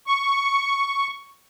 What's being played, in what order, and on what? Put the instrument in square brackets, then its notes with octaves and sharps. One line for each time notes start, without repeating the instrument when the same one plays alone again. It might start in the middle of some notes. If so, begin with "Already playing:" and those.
[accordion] C#6